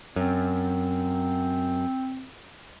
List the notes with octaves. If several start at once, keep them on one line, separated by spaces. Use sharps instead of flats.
F#2 C4